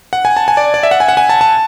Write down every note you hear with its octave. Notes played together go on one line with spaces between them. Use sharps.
F#5
G#5
A5
G#5
D5
D5
E5
F#5
G#5
F#5
G#5
A5
A5